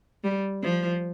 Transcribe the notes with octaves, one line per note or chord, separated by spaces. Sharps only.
G3
F3